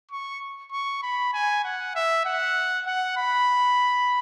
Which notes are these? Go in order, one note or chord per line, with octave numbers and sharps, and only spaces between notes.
C#6
C#6
B5
G#5
F#5
E5
F#5
F#5
B5